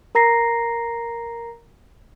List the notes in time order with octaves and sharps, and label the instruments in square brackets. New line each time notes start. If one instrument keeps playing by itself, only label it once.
[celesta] A#4 A#5 A#6 C7